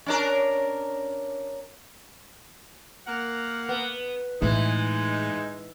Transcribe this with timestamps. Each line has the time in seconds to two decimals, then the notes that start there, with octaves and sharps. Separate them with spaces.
0.06 C#4 D4 A#4
3.07 A#3 A#4 F#5
3.69 B3
4.42 A2 E3 G#3 D#4